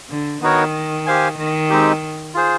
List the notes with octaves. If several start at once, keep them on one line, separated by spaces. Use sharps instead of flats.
D3
D#3 B3 D#4 F#4 A#4 C#5
G4 C5 F5 G#5
D#3
G#3 C4 D#4 G4
F4 G#4 C5